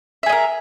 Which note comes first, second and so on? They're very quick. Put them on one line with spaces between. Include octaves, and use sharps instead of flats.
E5 G#4 D#5 A#4